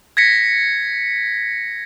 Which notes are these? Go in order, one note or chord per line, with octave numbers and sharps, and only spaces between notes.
G#6 A#6 B6 C#7